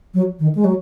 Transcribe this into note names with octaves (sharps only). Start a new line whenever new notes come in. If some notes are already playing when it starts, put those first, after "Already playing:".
F#3
D#3
G#3
F#3